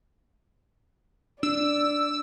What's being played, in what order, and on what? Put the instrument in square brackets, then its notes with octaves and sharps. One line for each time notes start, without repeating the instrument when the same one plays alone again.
[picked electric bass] D4 [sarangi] D5 [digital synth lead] E6